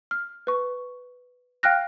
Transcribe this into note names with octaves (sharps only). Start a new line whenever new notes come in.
F6
B4 C#6
F5 G5 F6 F#6 A#6